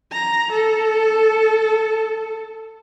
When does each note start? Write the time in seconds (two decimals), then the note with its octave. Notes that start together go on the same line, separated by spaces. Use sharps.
0.12 A#5
0.52 A4